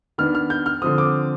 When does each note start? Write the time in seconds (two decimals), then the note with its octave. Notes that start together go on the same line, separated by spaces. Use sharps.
0.18 D#3 B3 D4 F6
0.35 F6
0.50 G6
0.66 F6
0.82 D3 F3 C4 D#6
0.98 D6